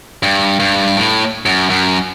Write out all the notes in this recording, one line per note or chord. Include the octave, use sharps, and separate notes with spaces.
G2
G2
A2
F#2
F#2